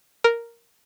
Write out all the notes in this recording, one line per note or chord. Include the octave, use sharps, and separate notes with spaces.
A#4